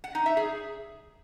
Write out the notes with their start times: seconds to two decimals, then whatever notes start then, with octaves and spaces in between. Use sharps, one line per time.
0.04 F#5
0.15 D#4
0.26 E5
0.37 G#4